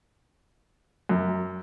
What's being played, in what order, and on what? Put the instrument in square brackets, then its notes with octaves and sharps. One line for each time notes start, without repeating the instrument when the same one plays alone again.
[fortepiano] F#2